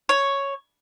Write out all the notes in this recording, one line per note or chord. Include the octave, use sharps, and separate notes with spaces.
C#5